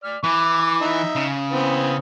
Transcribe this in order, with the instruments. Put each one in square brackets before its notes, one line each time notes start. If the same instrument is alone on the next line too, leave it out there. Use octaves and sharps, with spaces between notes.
[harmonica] D5 F6
[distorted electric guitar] E3 [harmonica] D6
[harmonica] D#4 E5
[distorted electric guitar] C#3
[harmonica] E3 B3 C4